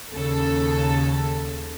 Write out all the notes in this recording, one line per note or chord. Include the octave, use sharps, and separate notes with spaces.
D#2 C#3 A4